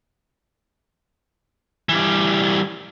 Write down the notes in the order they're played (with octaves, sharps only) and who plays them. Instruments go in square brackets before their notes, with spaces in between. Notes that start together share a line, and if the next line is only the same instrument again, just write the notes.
[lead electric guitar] E3 G3